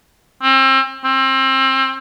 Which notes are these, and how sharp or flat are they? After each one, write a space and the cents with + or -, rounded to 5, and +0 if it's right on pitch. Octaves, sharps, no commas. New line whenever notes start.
C4 +35
C4 +30